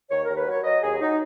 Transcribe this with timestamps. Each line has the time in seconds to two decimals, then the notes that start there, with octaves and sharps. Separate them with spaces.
0.09 D#2 C#5
0.23 D#2 A#4
0.36 B4
0.45 F#3
0.51 C#5
0.64 F#3 D#5
0.82 D#2 G#4
1.00 F#3 D#4